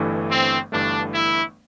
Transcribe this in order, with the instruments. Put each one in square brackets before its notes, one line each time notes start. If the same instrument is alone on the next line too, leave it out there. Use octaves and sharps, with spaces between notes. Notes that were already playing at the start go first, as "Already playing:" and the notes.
Already playing: [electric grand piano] G1 G2 E3 A3
[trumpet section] C4
[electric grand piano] G1 G2 E3 A3 [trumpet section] D4
[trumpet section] E4